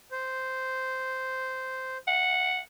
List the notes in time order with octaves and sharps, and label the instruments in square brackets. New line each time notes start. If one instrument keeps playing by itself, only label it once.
[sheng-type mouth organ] C5
[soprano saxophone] F#5